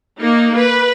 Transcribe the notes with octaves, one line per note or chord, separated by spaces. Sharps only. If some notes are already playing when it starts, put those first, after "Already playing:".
A#3 D#4
B4